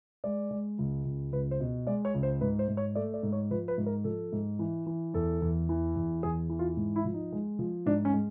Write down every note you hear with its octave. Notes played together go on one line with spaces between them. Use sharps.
G#3 D5
G#3
C#2
C#2
C#2 B4
C5
B2
G#3 D5
C#5
C#2
C5
G#2 B4
C5
G#2
C#5
A3 D5
D5
G#2
C#5
F3 B4
B4
G#2
A#4
F3 A4
G#2
E3
E3
E2 A4
E2
E3
E2
E2 G#4
E3
F4
G#2
E4
F3
D#4
G#3
F3
G#2 D4
C#4
G#3